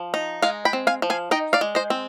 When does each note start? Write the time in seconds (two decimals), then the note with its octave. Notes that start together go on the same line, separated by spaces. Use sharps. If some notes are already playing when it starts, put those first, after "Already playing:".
Already playing: F3
0.14 D#4
0.42 G#3 F5 G#5
0.65 G5 B5
0.73 C4
0.87 F5 G#5
1.02 F3
1.10 F5 G#5
1.31 D#4 D#5 G5
1.53 D5 F5
1.61 G#3
1.75 C5 D#5
1.90 C4